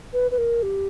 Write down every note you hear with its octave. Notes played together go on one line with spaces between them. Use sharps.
B4
B4
A#4
G4